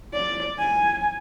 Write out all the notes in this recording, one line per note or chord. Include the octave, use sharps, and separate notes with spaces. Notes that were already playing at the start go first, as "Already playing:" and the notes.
D5
G#5